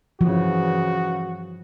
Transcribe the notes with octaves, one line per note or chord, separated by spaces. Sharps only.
G2 C#3 E3 F3 F#4